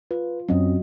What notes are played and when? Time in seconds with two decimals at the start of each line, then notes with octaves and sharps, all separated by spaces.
0.11 F4 B4
0.49 F#2 F#3 C4 C#4 D#5